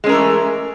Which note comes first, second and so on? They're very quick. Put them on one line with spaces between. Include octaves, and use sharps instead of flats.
G#3 C#4 A#4 E3 A3